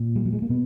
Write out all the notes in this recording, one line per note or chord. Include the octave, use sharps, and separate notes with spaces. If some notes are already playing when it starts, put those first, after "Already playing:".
Already playing: A#2
G3
F#3
G#3
A#3
B2 B3